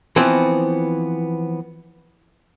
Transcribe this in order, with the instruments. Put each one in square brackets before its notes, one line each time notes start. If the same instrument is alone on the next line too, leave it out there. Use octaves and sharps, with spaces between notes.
[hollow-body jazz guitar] E3 F3 B3 C4